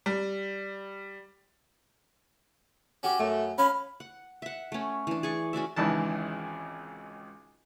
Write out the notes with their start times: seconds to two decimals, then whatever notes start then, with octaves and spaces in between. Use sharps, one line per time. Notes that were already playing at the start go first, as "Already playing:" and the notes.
0.06 G3
3.03 C#4 F#4 G4
3.20 F#2 A3
3.58 C#4 F5 B5
4.00 F#5
4.42 E5 F#5
4.72 A3 C#4
5.07 E3 D4
5.23 G#4 D5 C#6
5.53 C#4 F#4 D5 E5
5.76 G#1 C#2 D#3 E3 A5